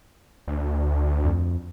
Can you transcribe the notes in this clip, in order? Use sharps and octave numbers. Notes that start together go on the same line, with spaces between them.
D2
F2